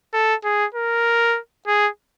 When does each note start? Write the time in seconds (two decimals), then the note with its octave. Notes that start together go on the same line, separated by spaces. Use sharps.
0.13 A4
0.44 G#4
0.74 A#4
1.67 G#4